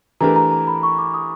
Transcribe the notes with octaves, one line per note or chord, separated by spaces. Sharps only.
E3 A3 D4 G4 A#4 A#5
A#5
A#5
B5
C#6
D6
D#6